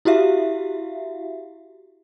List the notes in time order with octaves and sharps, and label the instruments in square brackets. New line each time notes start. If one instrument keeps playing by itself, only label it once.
[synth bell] E4 F#4 G4 E5 F5